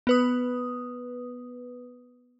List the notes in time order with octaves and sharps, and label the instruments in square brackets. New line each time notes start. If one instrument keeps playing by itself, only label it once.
[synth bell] B3 B4 D#6